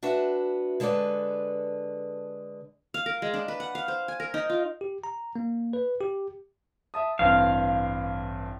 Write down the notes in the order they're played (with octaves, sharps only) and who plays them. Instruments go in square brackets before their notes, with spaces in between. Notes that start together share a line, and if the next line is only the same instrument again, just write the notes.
[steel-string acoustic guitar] D4 F#4 B4 E5
D3 G#3 A4 B4 D5
[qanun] F5
A#4
G#3
D4
B4
F#5
F5
C5
G#5
A#4
D#4
F4
[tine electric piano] G4
A#5
A#3
B4
G4
[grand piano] E5 A5 D#6
[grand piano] A1 G2 C4 [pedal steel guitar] F5